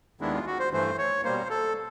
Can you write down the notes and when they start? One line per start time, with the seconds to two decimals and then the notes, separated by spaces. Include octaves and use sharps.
0.21 D#2 D#3 G#3 B3 D4 E4
0.34 F4
0.47 F#4
0.59 C5
0.73 G2 E3 A3 C5
0.98 C#5
1.24 B2 G3 A#3 C5
1.50 A4